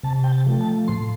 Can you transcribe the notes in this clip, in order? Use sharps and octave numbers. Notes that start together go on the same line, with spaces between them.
C3 A5
G5
A5
F3 A3
A5
A2 C6